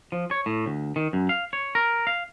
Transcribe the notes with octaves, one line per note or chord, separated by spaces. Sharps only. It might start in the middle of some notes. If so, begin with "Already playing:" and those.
F3
C#5
A2
D2
D#3
F#2
F5
C#5
A#4
F5